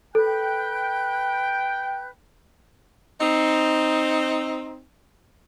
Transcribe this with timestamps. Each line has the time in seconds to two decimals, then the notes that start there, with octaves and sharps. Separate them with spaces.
0.15 A4 B4 G5 F#6 G6
3.21 C4 D#4